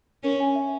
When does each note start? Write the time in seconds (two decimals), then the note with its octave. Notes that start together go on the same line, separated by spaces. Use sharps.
0.23 C#4 A#4
0.40 G#5
0.55 E5